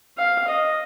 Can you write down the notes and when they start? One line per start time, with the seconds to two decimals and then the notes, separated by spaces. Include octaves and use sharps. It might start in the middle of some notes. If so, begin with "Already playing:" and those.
0.18 F5
0.47 D#5